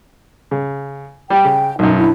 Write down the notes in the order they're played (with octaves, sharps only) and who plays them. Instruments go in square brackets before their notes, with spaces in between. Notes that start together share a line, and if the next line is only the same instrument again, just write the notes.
[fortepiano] C#3
[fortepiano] G3 [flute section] G5
[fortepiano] C#3
[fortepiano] B1 F#2 [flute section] D#4
[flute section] D4 E4